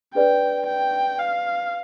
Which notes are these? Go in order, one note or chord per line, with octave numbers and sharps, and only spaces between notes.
D4 G#4 B4 D5 G5
G5
F5